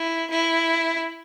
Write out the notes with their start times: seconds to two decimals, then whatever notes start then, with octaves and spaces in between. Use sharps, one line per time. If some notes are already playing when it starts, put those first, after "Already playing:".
Already playing: E4
0.31 E4